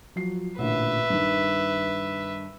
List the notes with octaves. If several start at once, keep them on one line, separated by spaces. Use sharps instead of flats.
F3 F#3 C7
A1 A#2 D3 B4 E5
G2 D#3